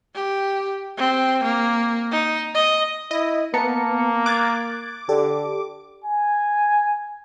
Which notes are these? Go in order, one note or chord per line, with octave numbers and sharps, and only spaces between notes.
G4
C4
A#3
D#4
D#5
E4 D#5
A#3 B3 A5 A#5 C#7
D6 F#6 G#6 A6
D3 G4 A4 D5
G#5